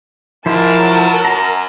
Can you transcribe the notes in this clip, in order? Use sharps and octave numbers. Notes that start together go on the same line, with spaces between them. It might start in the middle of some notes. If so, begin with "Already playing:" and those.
G#2 F3 E4 A#4 C5 A5
F#3
F#2 A#5